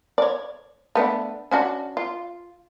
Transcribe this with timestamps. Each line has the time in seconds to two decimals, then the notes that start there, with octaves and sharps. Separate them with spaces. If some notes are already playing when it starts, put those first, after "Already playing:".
0.18 C#5 D5
0.95 A3 B3 D4
1.51 C#4 D4 F#4
1.97 F4